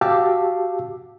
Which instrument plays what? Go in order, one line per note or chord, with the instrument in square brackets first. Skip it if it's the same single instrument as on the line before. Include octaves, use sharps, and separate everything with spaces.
[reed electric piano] F#4 G4 F5 A5 D6 E6